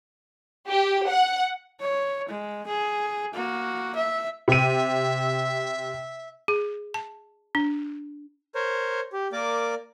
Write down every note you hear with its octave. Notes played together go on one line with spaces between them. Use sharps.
G4
F#5
C#5
G#3
G#4
A#3 F#4
E5
C3 E5 D#7
G#4
A5
D4
A#4 C5 C#5
G4
A#3 A#4 D5 D6